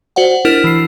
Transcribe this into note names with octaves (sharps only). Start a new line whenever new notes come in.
F#4 C5 D5 F#5
D4 E4 A#4 F6 E7
E3 C7